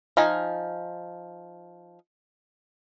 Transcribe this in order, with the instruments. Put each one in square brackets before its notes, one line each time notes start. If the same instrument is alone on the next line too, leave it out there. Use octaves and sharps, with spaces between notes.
[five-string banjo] F3 D#4 G#5